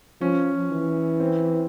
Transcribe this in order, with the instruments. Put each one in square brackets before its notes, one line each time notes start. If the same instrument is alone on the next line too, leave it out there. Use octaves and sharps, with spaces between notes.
[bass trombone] F3 [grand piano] C#4
[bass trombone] E3
[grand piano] C4